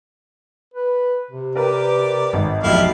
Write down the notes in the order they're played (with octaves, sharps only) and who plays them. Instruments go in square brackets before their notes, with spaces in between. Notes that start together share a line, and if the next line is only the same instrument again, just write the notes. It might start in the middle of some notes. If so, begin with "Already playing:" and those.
[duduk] B4
C3
[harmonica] G4 D5 [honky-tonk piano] A#4 B4
[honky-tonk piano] G#1
[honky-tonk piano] F1 B1 [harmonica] G3 E4 F5